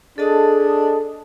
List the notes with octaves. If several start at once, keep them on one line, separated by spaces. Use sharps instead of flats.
D4 G#4 A4 D#5 A5